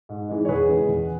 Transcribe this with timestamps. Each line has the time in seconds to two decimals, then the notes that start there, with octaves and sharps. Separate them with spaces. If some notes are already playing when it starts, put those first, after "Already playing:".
0.09 G#2
0.29 E3 G#3
0.45 C#5
0.49 E2 G#4 B4
0.69 C#3 E3 G#3
0.89 E2